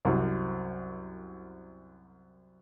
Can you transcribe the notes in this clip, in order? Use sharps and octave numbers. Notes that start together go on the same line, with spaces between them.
C2 F#2